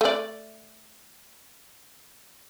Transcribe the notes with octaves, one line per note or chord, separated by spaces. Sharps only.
A3 D5